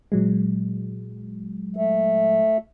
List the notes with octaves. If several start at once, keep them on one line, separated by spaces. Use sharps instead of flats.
A#2 F#3 G#3
A3